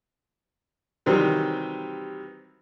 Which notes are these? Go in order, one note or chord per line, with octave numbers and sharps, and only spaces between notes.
C3 D#3 E3 F#3 G3 C4